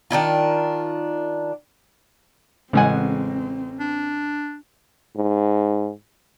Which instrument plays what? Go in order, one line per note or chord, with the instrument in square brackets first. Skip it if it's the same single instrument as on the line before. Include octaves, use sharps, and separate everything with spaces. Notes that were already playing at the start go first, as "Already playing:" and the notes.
[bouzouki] D#3 D4 E4 F4
[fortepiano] A1 G#5 [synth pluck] C#3 G#3 F#5 [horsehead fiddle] C4
[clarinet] D4
[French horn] G#2